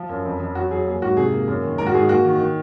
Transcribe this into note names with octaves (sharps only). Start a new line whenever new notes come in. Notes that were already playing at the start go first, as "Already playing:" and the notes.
Already playing: F3
F#2
F2
F2
F#3 F#4
F#3 G#4
A#3 G#4
G#2 F#4
C3 G#4
A#3
F#2
D#3
G#2 A#4
F#4
G#2 G#4
A#3 F#4
D#3
D#3